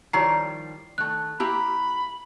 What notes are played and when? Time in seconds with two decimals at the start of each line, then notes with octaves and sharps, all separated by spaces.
0.13 D#3 F3 G3 E4 C#5 A#5 C7
0.98 D#3 A3 F#6
1.40 A#3 E4 G4 A#5 B5